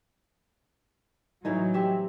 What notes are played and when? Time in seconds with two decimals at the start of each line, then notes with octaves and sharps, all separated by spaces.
1.45 A2 E3 F#3 D#4
1.74 C4 G4 E5